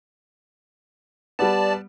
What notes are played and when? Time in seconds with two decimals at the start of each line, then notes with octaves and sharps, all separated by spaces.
1.39 G3 B3 D5 A5